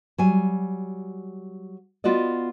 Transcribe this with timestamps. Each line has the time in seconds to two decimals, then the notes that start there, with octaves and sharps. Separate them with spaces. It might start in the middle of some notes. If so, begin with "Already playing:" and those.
0.18 F#3 G3 G#5
2.04 B3 F4 F#4 D5 D#5